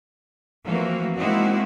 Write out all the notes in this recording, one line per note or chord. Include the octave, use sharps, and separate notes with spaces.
E3 F3 A3 A#3 C4 F#4
G#3 A#3 C4 D#4 E4 F#4